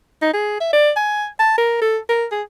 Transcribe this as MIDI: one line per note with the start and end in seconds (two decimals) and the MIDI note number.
0.22 0.33 63
0.33 0.57 68
0.60 0.71 76
0.73 0.91 74
0.96 1.27 80
1.39 1.58 81
1.58 1.79 70
1.81 1.98 69
2.09 2.26 70
2.31 2.42 68